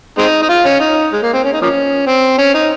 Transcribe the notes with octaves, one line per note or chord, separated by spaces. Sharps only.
G#3 C4 D#4
D#4
F4
C#4
D#4
G#3
A#3
C4
C#4
D#4
F3 A#3 C#4
C4
C#4
D#4